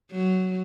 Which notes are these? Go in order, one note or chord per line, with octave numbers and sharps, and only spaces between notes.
F#3